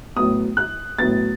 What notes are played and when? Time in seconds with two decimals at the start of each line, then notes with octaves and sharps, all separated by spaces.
0.16 A2 F#3 B3 D#6
0.57 F#6
0.98 A2 F#3 B3 A6